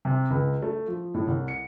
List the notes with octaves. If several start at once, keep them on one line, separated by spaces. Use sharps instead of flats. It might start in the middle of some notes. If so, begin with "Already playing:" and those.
C3
C#2
A3
F3
A2
C2
C#7